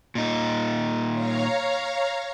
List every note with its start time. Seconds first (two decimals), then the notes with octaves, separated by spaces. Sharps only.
0.15 A#2 D#4
1.12 C#5 F5 A#5